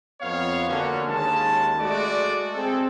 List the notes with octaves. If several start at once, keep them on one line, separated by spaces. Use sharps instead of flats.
F2 B3 C#5 F5
D3 A#3 C#4 F#4
D#2 G#3 C#4 A5
G#3 A3 F#4 D5
C4 G#4 A4